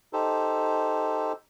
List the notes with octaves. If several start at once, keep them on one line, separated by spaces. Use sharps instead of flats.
D#4 G4 A4 C5